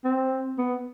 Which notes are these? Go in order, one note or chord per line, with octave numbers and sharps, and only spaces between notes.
C4
B3